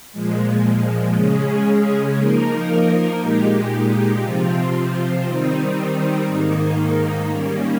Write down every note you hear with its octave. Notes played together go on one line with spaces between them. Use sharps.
A#2 F3 G#3
C#3 G#3 C#4 G#4
F3 A#3 D#4 A#4
A#2 G#3 D#4 G4
C3 F3 C4 F4
D#3 G3 C4 D#4
G#2 D#3 A#3 D#4
D#3 G3 A#3 C#4